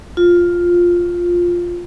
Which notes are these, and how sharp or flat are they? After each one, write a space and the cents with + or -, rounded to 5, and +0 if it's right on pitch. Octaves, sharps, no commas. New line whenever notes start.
F4 +5